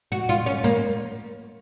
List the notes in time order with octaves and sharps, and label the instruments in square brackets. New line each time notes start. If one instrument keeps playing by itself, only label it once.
[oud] F#4
F4
C#4
A#3